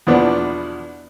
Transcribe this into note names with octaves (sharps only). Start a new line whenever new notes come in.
E2 B2 F3 B3 D4